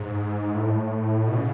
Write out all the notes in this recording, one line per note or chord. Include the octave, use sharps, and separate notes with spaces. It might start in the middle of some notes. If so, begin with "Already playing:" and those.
Already playing: G#2
A2
B2
C#3